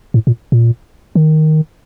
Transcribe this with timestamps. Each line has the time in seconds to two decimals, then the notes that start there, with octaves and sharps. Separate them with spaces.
0.14 A2
0.27 A#2
0.52 A#2
1.15 D#3